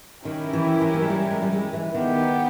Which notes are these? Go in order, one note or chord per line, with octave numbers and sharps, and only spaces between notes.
D#3 C#4 E4 G4 A#4
E3
E3
A#3
G#3
G3
G#3
G3
G#3
E3
D#3 B3 D#4 G4